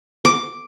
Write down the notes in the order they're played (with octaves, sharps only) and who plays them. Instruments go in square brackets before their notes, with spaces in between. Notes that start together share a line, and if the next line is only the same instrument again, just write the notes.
[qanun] D6